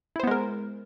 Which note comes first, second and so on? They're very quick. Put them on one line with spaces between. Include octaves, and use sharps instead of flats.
E4 C5 B3 G#3 A#4